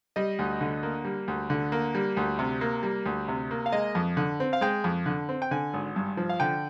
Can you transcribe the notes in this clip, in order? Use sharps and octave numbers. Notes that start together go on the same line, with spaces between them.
G3 D#5
D2
D3
A#3
G3
D2
D3
A#3
G3
D2
C3
A#3
G3
D2
C3
A#3
F5
G#3 D#5
F2
D3
C4
F5
G#3 G5
F2
D3
C4
G5
D3 G#5
G#1
G2
F3
F5
D3 G5